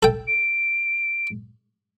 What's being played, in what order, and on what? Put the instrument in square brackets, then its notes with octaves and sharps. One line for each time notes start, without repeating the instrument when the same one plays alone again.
[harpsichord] A4 G5
[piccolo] D7